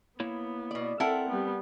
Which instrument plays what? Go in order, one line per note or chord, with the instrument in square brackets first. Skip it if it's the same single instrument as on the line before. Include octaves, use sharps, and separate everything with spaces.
[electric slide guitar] A#3 E4 C#5 [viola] B3
[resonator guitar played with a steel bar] B2 D5
[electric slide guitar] C4 [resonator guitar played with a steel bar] E4 [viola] A4 [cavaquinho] A#4 F#5 A5
[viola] G3 B3